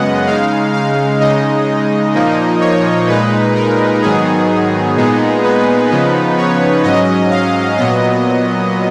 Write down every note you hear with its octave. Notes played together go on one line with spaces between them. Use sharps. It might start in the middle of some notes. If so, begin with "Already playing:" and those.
Already playing: F#2 C#3 G#3 B3 D#5 F#5
C#3 G#3 D#4 F5
F5
C#3 G#3 D#4 D#5
A#2 F3 A#3 D#4
C#5
A#2 G#3 D#4 B4
A#4
G#2 D#3 F#3 B3 D#4 G#4
A#2 G#3 B3 D#4
B4
C#3 F3 B3 D#4
C#5
G#2 F#3 C#4 D#5
F5
A#2 F#3 B3 D#5